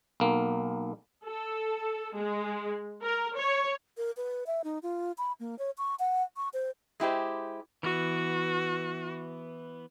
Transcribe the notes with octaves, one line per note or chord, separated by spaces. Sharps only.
B1 A#3
A4
G#3
A#4
C#5
A#4
B4
E5
D#4
F4
B5
A#3
C#5
C#6
F#5
C#6
C5
G#3 E4 G4 C5
E3 B3 F#4